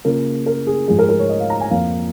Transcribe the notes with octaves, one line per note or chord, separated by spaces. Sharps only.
C#3 A#3 F4 A#4
A#4
G#4
G#2 F3 G#3 G#4
A#4
A#4
C#5
D#5
F5
A#5
G#5
F2 F3 A#3 F5